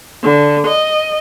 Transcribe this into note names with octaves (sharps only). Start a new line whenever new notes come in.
D3
D#5